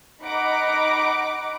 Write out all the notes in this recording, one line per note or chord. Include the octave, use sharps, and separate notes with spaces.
D#4 F#5 B5 D6 D7